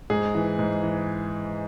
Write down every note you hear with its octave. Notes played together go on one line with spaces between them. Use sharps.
G#2 G#4
E3
G#2
E3